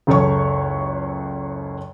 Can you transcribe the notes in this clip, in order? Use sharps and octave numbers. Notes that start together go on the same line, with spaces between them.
F#1 C#2 A4 C#5 C#6